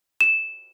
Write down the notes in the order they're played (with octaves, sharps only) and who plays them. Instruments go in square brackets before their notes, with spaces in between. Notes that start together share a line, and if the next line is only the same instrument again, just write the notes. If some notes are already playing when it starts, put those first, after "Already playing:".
[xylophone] E7